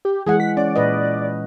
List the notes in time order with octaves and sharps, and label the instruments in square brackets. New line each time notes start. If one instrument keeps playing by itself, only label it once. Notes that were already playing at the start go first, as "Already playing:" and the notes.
[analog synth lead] G4
[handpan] E3 G#3 F#5 [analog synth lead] G#4
[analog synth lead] B6
[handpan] C#4 [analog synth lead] D5
[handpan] A#2 B4 D#5